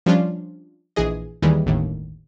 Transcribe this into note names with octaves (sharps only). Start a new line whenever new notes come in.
F3 G3 C#4 D4 F4
A#1 E3 G#4 D#5
D#2 D#3 E3 G3 G#3
G1 D#2 A2